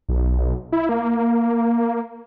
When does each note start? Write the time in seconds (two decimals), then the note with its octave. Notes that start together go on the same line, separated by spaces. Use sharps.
0.09 B1
0.72 E4
0.89 A#3